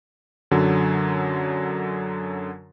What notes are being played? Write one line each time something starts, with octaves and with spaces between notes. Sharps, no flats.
F#2 D3 F#3